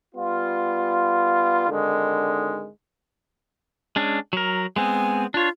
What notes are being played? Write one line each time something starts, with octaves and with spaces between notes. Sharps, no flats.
G3 B3 F4
G#1 D3 D#3 G#3
G#3 C#4 D4
F#3 A#4
G#3 B3 C4 G#5
D4 F4 C#5